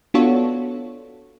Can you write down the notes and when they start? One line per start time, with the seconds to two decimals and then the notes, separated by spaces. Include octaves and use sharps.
0.14 B3 D4 F4 F#4 A4 C#5